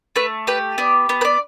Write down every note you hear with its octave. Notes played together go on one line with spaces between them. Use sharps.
A3 B4
G4 B4
B3 D5
B3
B4
D5